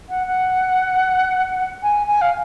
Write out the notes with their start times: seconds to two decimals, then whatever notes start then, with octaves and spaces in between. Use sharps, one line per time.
0.09 F#5
0.27 F#5
1.83 G#5
2.07 G#5
2.21 F5